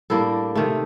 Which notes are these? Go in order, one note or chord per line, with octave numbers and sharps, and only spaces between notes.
A2 G3 A#3 D4 A4
C3 D#3 A3